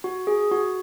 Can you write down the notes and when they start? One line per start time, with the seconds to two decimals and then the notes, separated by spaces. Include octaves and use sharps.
0.04 F#4
0.27 G#4
0.51 F#4